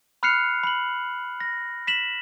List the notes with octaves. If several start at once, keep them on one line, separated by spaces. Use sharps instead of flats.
B5 F6 F#6 C7 C#7 F7
B5 F#7
A#6
B6 E7 F#7